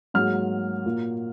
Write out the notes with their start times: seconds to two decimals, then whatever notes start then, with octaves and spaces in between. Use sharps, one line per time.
0.14 G#2 F#3 A#3 F6
0.85 A#2 F#3 A#3